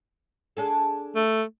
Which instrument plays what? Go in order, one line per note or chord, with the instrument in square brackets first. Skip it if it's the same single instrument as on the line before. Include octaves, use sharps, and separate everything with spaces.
[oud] D4 G#4 A4
[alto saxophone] A3